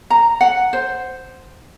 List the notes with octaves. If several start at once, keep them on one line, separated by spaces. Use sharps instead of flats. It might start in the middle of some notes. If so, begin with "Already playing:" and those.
A#5
F#5
C5